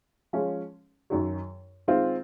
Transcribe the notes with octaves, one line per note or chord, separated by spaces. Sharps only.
F3 G#3 C#4
F#2 D#3 F#3
D#3 G#3 C4 F4